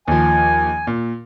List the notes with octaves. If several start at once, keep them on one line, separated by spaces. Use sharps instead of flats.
D#2 F3 G#5
A#2